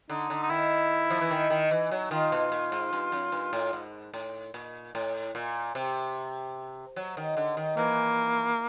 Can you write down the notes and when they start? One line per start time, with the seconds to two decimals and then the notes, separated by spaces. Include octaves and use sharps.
0.09 D3 D#4
0.30 D3
0.42 D#4
0.50 D#3 E4
1.10 F3
1.21 E3
1.31 D#3
1.50 D#3
1.71 E3
1.91 F#3
2.11 D#3 F4
2.32 B2
2.52 A#2
2.72 G#2
2.93 G2
3.12 F#2
3.32 G2
3.53 A2
3.73 G#2
4.14 A2
4.54 A#2
4.95 A2
5.35 A#2
5.75 C3
6.96 F#3
7.17 D#3
7.37 D3
7.57 D#3
7.77 E3 A#3